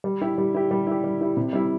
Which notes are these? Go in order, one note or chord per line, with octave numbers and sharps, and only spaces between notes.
G3
E4 G4
G3
E4 G4
G3
E4 G4
G3
E4 G4
C3
G3 E4